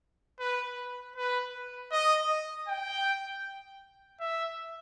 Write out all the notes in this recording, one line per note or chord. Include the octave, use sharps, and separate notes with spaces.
B4
B4
D#5
G5
E5